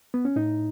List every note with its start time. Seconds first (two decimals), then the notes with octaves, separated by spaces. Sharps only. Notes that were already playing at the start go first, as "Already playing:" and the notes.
0.14 B3
0.25 C#4
0.36 A2 D#4